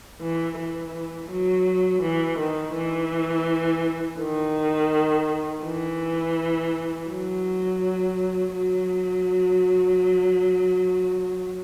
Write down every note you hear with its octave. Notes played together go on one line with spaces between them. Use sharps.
E3
E3
F#3
E3
D#3
E3
D#3
E3
F#3
F#3